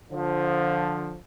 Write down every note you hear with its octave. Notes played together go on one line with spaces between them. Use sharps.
D3 F3